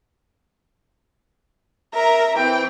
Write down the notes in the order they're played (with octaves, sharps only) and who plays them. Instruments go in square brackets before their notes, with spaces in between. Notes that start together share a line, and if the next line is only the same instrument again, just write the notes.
[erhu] A#4 [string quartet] E5 A#5
[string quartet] E3 C4 [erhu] G5